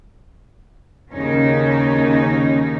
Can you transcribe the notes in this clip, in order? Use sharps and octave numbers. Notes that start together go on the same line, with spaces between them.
D#2 C#3 C#4 D#4